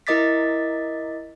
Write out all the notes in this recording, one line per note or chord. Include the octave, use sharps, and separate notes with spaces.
E4 A#4 D#5 D6 A6 B6